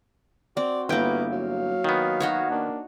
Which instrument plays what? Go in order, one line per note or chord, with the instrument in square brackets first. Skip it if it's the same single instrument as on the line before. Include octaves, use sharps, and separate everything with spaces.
[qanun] C4 [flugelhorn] F#4 [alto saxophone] D5
[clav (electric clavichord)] G1 G5 [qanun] A#3 E4 [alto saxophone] B3
[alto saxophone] F#3 [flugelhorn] F5
[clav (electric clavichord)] D#3 B3
[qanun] D#4 F#4 C#5
[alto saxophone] A#3 [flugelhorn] D4